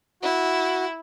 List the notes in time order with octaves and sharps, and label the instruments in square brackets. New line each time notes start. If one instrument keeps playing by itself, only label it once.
[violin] E4 [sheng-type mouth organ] F#4